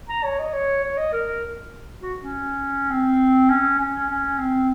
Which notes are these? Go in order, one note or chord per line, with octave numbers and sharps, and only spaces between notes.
A#5
C#5
D#5
C#5
C#5
D#5
A#4
F#4
C#4
C4
C#4
C#4
C#4
C#4
C4